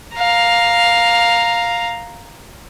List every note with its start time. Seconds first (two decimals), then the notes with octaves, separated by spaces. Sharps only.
0.15 F5 A#5